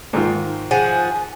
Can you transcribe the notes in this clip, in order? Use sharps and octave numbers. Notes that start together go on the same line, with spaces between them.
G#2 D#3 F4
F3 G#4 F#5 G#5